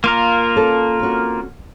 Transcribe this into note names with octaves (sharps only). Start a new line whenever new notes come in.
A#3 F4 A#4
C#4 A4
C4 C#4 F#4